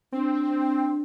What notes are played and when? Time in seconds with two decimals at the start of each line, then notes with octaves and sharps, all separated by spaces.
0.12 C4 D4